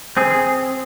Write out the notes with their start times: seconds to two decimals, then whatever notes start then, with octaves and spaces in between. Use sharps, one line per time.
0.17 C4 G#4
0.31 G#4